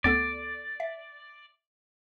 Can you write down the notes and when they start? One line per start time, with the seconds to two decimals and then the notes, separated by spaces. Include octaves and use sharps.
0.04 D2 B3 A4 D5
0.80 E5